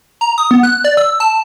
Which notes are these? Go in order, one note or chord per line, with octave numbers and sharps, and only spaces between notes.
A#5
D#6
B3
F#6
D5
E6
A5